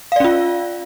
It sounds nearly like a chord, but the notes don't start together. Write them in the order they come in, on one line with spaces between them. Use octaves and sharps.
F5 D5 C#4 F4